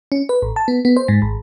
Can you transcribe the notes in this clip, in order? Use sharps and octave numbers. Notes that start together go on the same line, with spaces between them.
C#4
B4
A1
A5
B3
B3
C5
G#2
G#1